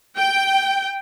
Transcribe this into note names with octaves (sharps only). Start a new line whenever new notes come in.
G5